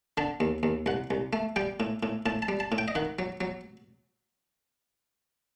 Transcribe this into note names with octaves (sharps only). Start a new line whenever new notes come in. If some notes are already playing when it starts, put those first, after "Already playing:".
D3 A5
D#2
D#2
C2 F#5
C2
A3
G3 G5
A2
A2
A2 A5
A5
G3
A5
A2
G5
D#5
D#3 F#5
F#3
F#3